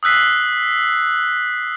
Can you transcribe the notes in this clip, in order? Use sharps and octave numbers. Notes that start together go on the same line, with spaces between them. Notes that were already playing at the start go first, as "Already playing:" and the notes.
D#6 E6 F#6 B6 C7